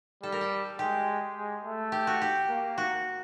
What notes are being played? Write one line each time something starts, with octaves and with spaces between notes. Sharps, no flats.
G3 A4
A#4
A4
G#3 G4
G#3
A3
G4
F#4
G4
A#3
F#4